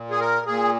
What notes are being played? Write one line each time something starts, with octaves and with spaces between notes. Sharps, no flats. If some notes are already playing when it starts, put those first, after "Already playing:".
Already playing: A#2
G#4
A#4
A#2 G#4